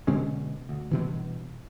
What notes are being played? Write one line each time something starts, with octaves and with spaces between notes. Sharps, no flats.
B2 D3 G#3 C#4
D2
G2 B2 E3